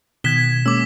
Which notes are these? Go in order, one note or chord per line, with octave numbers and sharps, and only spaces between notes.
B2 D#3 G#6 B6 E7 G7
G#3 A#3 C#4 D6 E6